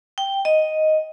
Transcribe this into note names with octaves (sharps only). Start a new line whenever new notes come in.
G5
D#5